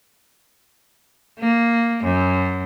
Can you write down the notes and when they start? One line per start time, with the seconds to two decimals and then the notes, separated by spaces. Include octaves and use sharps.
1.39 A#3
2.04 F#2